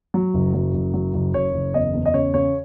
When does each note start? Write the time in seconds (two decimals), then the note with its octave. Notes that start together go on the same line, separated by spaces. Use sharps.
0.14 F#3
0.34 F#1
0.54 F#3
0.73 F#1
0.94 F#3
1.14 F#1
1.34 F#1 C#5
1.54 F#1
1.74 E2 D#5
1.94 E2
2.05 D#5
2.14 C#3 C#5
2.34 C#3 C#5